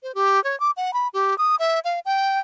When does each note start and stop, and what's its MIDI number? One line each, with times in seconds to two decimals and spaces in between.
0.03 0.14 72
0.15 0.42 67
0.44 0.58 73
0.60 0.71 86
0.77 0.93 78
0.93 1.08 83
1.13 1.37 67
1.38 1.56 87
1.59 1.80 76
1.85 2.00 77
2.05 2.39 79